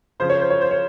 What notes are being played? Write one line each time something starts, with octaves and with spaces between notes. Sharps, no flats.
C#3 F3 C5
C#5
C5
C#5
C5
C#5